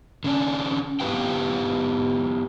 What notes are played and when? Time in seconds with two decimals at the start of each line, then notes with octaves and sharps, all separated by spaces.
0.24 D3 C#4 D4
1.00 B3 E4 G4 B4 F5 G5